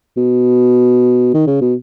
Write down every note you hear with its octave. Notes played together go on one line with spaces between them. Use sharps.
B2
D#3
C#3
B2